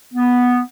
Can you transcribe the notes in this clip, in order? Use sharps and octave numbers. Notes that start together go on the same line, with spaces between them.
B3